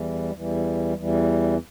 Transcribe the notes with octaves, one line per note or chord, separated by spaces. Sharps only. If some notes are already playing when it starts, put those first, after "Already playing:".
Already playing: E2 E3 G3
E2 E3 G3
E2 E3 G3